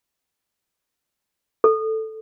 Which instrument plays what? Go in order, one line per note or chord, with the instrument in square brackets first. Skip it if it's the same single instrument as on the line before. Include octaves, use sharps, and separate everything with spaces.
[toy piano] A4